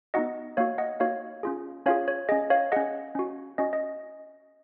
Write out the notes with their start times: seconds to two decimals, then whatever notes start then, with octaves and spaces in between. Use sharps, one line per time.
0.14 B3 D#4 F#4 D#5 F#5
0.57 A#3 D#4 F#4 C#5 F5
0.78 D#5 F#5
1.00 A#3 D#4 F#4 C#5 F5
1.43 C#4 F4 G#4
1.86 C#4 F4 G#4 C#5 F5
2.08 C#5
2.29 C#4 G#4 D#5
2.50 C#5 F5
2.72 C#4 G#4 D#5 F#5
3.15 C#4 F#4
3.58 C#4 F#4 D#5
3.73 D#5